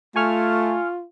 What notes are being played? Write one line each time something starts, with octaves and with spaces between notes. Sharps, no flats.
A3 F4 G#5 C#6 F6